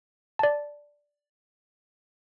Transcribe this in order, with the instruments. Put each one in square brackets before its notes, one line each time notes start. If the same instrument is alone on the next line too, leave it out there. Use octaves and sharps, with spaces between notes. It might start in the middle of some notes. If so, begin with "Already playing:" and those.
[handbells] D5 A5